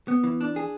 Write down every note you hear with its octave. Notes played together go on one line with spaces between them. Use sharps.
B3
E3
D4
G#4